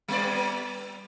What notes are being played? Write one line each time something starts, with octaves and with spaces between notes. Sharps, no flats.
G3 B3 D5